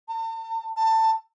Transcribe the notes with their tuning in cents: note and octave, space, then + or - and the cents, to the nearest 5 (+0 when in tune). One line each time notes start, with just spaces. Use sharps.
A5 +45
A5 +20